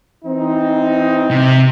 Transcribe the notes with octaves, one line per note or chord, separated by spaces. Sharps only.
E3 C4 D#4
C3